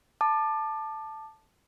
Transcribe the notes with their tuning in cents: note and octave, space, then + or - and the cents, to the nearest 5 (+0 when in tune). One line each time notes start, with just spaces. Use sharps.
A5 +0 D6 +30